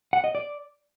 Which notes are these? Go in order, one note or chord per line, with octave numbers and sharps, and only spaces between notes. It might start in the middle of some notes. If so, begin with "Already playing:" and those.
F#5
D#5
D5